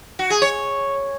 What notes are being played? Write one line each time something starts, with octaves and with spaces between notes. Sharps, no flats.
F#4
G#4
C#5